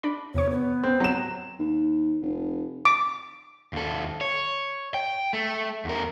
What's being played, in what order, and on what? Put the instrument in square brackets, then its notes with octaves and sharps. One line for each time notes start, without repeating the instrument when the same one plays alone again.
[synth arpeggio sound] D4 D5 B5
[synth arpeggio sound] E2 C3 C#6 [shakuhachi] C#5
[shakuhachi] B3
[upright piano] C4
F#3 E7
[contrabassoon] D#2
F1
[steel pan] D6
[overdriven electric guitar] D#2 A4
C#5
G5
A3
E2 A#4